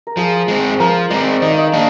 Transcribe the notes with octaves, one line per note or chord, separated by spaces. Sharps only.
A#4
F3 G#4
G#3 C4
F3 A#4
G#3 C4 D5
D#3 D#5
F5
D#5
A#3 D4